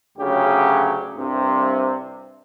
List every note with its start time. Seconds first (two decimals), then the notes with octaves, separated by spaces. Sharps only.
0.18 D2 C#3 F#3 G4
1.15 C2 G2 C3